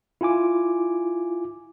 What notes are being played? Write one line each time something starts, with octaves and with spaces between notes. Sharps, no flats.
E4 F4 G#5 D6